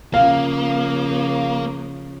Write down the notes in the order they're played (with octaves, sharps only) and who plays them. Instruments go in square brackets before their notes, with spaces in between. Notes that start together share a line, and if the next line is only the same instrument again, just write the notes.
[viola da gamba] C#3 F3 [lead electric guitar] A#3 [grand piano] F5